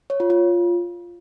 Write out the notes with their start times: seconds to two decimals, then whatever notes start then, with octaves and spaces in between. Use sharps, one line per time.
0.10 C#5
0.20 F4
0.30 F4